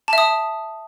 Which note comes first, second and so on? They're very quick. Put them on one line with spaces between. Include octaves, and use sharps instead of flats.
A5 E5 D#6